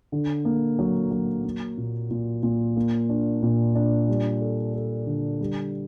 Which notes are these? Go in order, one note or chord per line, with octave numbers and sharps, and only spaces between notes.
D3
A#3
F#3
F#3
A#3
A#2
A#2
A#2
A#3
D4
A#2
D4
G3
A4
A4
D3
G3